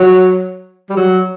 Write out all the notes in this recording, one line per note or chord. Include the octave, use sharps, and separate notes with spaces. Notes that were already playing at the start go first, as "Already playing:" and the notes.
Already playing: F#3
G3
F#3